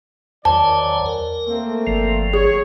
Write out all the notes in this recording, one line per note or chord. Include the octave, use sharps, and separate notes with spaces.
E2 D#3 F#3 C5 D5 G#5 A5
A#4
A3 A#3 C4
G1 F3
G#4 C#5